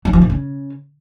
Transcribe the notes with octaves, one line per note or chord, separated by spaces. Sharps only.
F#3
F3
A#2
C#3